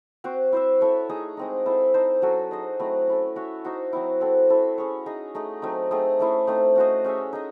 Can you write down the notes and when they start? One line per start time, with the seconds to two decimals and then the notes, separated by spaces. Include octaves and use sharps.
0.24 C4 F#4 C5
0.52 E4 C5 E5
0.81 E4 A4 C#5
1.09 A3 D#4 G#4
1.37 G#3 C4 D#4
1.65 C4 E4 A4 C5
1.94 D#4 A4 C5 E5
2.22 F#3 C#4 F#4 A4
2.51 D#4 G#4 C5 D#5
2.79 F#3 A3 C4 E4
3.07 C#4 E4 A4
3.36 C#4 F#4 C#5 E5
3.64 D#4 F#4 C5
3.93 F#3 C4 E4
4.21 C4 F#4 A4
4.49 E4 A4 C5
4.78 C#4 G#4 C#5
5.06 D#4 G#4 D#5
5.35 A3 D#4 G#4
5.62 F#3 A3 C4 D#4
5.91 A3 C4 D#4 G#4
6.19 A3 C#4 E4 C5
6.47 A3 C4 D#4
6.76 C#4 F#4 C5 D#5
7.04 C#4 G#4 C#5 E5
7.33 D#4 G#4 D#5